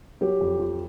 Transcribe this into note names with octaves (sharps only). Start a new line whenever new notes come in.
F#3 G4
F2
F3